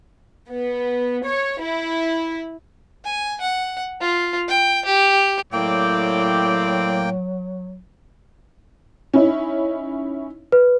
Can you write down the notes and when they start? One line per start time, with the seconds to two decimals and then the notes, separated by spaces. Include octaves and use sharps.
0.50 B3
1.25 C#5
1.61 E4
3.05 G#5
3.41 F#5
4.01 F4
4.48 G5
4.85 G4
5.53 A2 F#3 A#3 C4 G4 D5 G5
9.14 C#4 D#4 E4
10.52 B4